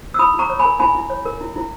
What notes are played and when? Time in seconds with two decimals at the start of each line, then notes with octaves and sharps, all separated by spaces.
0.14 E6
0.19 E4 B5 D#6
0.34 E4
0.39 A#5 C#6
0.50 C#5
0.59 G#5 B5
0.65 A#4
0.79 E4 G#5 B5
0.95 E4
1.10 C#5
1.26 A#4
1.41 E4
1.56 E4